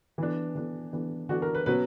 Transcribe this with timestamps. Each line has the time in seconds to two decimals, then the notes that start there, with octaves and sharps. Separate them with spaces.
0.18 E3 B3 D4
0.55 E3 B3 D4
0.93 E3 B3 D4
1.29 E3 B3 D4 F#4
1.42 A#4
1.54 B4
1.66 B2 F#3 C#4 B4